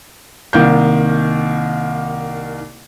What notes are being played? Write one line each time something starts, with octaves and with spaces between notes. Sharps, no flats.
C2 D#3 A#3 G6